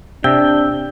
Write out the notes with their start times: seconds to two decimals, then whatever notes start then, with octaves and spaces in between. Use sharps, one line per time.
0.24 C3 D4 G5 E6